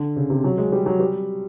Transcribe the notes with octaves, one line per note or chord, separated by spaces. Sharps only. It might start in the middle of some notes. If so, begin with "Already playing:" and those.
Already playing: D3
C#3
C3
F#3
G#3
G3
F#3
G3